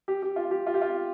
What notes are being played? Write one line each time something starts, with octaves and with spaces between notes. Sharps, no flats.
G4
G4
F4
G4
F4
G4
F4